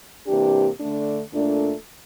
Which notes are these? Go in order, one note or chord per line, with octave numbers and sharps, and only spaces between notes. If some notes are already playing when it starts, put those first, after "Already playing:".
C3 E3 A#3 D4 G4
D3 A3 D4
A#2 A3 D4 A4